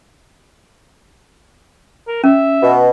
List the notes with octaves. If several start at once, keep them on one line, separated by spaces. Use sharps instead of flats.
A#4
C#4 E5
B2